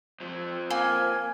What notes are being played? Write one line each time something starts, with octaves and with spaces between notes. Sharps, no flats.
F2 F3
A#3 G#5